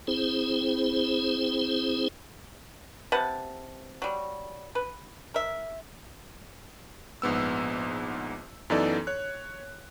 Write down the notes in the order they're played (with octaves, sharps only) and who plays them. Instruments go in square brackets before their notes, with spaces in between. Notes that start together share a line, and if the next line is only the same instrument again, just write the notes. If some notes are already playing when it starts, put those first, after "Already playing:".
[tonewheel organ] C4 E4 G#4 C5
[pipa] C3 B4 F#5 A5
F#3 G3
B4
A#4 E5
[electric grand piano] A#1 G#2 B3 E6
F#2 E3 B3 D#4 A4 D5
C#5 F#6